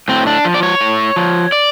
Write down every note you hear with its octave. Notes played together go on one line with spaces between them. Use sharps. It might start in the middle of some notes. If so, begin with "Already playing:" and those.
A2 C4
D4
F3
D5
C#5
A2
F3
D5